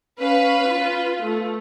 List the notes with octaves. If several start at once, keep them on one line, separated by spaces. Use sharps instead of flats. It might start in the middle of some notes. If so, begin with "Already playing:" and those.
C#4 B4 F5
F4
A3